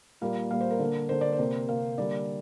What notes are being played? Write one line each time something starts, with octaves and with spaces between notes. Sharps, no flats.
A#2 G3 A#3 F5
A#2 G3 A#3 F5
C5
A#4
D3 A#3
D3 A#3 C5
D5
C5
C3 A#3
C3 A#3 F5
D3 G3 A#3 D5